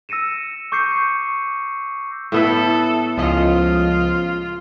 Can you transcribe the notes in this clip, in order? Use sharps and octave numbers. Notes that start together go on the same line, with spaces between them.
E6 A#6 C#7 D#7 E7
C#6 D6 G6 C7 C#7
A2 B3 E4 A4
C#2 F3 F4 D#5